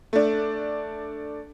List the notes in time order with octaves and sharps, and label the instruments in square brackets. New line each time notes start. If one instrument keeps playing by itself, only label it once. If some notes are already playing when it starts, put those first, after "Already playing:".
[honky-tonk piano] A3 D4